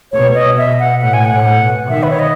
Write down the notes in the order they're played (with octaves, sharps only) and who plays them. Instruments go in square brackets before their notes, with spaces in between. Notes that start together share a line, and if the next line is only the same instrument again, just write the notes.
[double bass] B2 [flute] C#5
[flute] D#5
E5
F#5
[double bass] A2 [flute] F#5
[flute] G#5
F#5
[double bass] A2
B2
[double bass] D#3 [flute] E5
[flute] B4
C#5
D#5